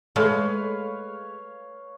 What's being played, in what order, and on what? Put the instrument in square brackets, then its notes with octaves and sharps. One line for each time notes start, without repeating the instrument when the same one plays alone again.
[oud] G#3 [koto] A3 [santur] B4 C#5 F5